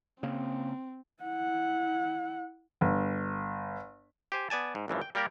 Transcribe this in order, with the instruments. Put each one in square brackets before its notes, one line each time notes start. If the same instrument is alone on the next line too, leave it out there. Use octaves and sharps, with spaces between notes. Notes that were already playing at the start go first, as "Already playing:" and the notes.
[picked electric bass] C#3 A#3 [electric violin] C4
[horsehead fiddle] E4 F#5
[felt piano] G1
[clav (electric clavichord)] G4 C5 G#5
B3 D5 G#5 A5
G#2
G#1 F#2 E3 F3
G5
G3 A#3 G4 A#4 D5